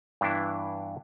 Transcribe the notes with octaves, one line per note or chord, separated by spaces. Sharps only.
G2 E3 B3 D4 E4